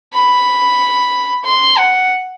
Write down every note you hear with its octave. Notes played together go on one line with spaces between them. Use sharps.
B5
C6
F#5